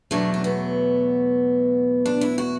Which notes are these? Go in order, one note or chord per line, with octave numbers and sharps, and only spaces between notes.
E2 B2 F#3 A3 D4
D4
B3
D4
E4
F#4